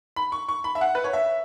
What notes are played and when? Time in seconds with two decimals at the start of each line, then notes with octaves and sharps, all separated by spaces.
0.16 B5
0.32 C#6
0.49 C#6
0.64 B5
0.75 E5
0.81 F#5
0.95 B4
1.04 C#5
1.13 E5